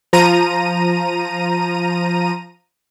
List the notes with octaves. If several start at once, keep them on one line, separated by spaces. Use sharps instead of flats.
F3 A#5 D#7